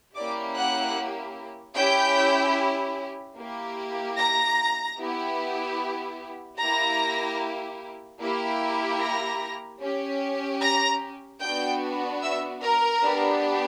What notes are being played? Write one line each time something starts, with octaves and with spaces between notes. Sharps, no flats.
A#3 C#4 E4 G4 D5 D6
F#5 F#6
C#4 E4 G4 G5 G6
A#3 E4 G4
A#5 A#6
B3 E4 G4
A#3 E4 G4 A#5 A#6
A#3 E4 G4
A#5 A#6
C#4 G4
A#5 A#6
B3 D4 F#4 G5 G6
E5 E6
A#4 A#5
B3 D4 G4